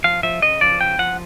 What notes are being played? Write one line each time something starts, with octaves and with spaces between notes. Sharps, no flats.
F3 F5
F3 E5
C#3 D#5
F3 D5
C#3 G5
F3 F#5